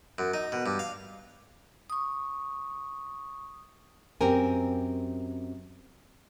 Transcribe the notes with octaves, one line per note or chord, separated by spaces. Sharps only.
F#2
D#4
B2
G2
F5
C#6 D#6
F#2 C4 G4 A#4 G#5